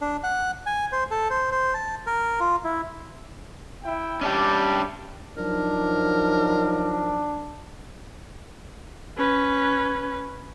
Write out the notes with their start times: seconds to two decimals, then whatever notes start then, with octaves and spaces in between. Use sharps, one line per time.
0.01 D4
0.24 F#5
0.66 G#5
0.92 C5
1.11 A4
1.30 C5
1.52 C5
1.74 A5
2.07 A#4
2.40 F4
2.64 E4
3.83 E4 G5
4.21 G3 C#4 D4 G4
5.37 F3 F#3 D4 D#4 A#4
9.18 C#4 B4